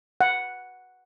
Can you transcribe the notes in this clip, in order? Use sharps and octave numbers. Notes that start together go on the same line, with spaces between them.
F#5